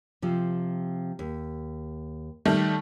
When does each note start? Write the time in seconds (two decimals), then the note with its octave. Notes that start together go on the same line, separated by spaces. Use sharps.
0.22 C3 F3
1.19 D#2
2.45 D#3 G3 A3